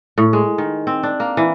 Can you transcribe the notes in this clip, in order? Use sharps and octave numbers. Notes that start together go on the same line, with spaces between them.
A2
G#3
D#3
C4
D4
A#3
E3